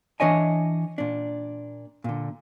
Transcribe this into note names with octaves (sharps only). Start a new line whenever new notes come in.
E3 D4 C#5 D#5 G#5
A#2 D4
A#2 D3